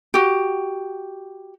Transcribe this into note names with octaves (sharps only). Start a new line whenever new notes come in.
F#4 G4